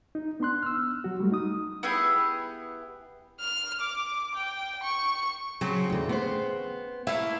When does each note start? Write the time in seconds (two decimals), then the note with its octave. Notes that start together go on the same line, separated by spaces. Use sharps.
0.15 D#4
0.40 B3 D4 C6 F#6
0.63 E6 F6
1.04 F#3 F#4
1.20 G3 A3 F#4
1.32 D#4 D#6
1.83 B3 E4 G4 G#4
3.40 F6
3.81 D6
4.35 G5
4.83 C#6
5.61 C#3 F#3 C4
5.90 E2 D3
6.09 B3 C5
7.07 A3 A#3 E4 F5